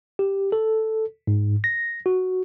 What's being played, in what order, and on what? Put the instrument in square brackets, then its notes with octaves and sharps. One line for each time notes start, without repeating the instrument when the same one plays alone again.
[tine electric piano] G4
A4
G#2
A#6
F#4